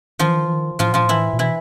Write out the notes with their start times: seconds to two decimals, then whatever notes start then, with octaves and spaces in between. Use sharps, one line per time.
0.19 D#3 F3 F4
0.29 E3
0.36 D#3
0.46 E3
0.53 D#3
0.79 A2 F3 F4
0.91 A#2 F3 F4
1.05 A2 E3 E4
1.33 A#2
1.39 B2 E3 E4